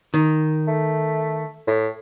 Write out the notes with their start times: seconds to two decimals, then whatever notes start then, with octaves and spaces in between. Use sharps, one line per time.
0.14 D#3
0.68 A3
1.67 A2